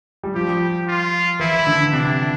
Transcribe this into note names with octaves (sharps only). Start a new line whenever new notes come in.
G3
F3 G4
F4
E3 E4
D3
C3 D4